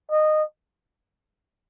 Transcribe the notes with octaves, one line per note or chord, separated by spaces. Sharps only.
D#5